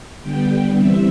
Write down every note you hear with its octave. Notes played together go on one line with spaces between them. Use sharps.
D3 G3 B3 G5
E3 G3 C4 E5